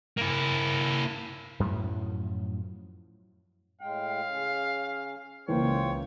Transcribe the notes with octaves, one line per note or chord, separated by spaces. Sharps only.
A#3 E4
F#2 A2 F3 F#3
A2 G#3 F5 G5
C#3 C#4
C#2 E3 A#3 F4 C5 C#5 G5